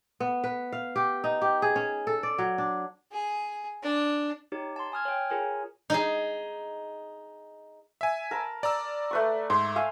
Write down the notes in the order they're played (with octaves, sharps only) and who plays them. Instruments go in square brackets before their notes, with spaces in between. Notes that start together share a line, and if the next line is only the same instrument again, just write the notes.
[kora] B3
B4
F5
G4
D#4
G4
G#4
C#4
A4
D5
F#3
D4
[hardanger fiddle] G#4
D4
[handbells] D#4 G4 C#5
A5 C6
G#5 D#6 F6 G#6
C#5 G5
F4 G#4 A#4 C#5 G#5
[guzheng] D#4 G#4
[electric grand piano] E5 G#5
[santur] A#4 A5 B5
[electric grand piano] D5 A#5 E6
[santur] A3 B4 C#6
[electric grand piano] G#2 [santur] C6
[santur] E5 F5 G#5